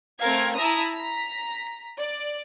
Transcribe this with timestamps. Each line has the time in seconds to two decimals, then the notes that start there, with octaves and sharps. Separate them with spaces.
0.19 A3 C4 A#4 F5 G#6
0.57 E4 E5 A5 A#5 D#6
0.96 A#5 B6
1.99 D5